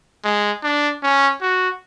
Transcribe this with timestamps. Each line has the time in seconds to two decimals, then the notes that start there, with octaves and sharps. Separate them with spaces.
0.24 G#3
0.63 D4
1.03 C#4
1.42 F#4